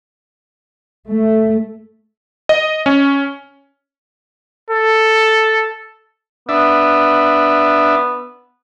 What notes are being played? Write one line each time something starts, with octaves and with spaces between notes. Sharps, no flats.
A3
D#5
C#4
A4
B3 D4 E5